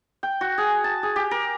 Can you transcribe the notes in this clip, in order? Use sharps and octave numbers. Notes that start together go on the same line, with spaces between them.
G5
F#4
G#4
A5
G#4
G4
A#4